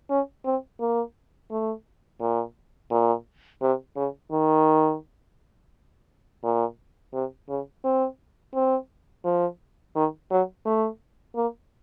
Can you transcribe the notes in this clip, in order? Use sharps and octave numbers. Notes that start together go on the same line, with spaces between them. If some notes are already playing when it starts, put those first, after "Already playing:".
C#4
C4
A#3
A3
A#2
A#2
C3
C#3
D#3
A#2
C3
C#3
C4
C4
F3
D#3
F#3
A3
A#3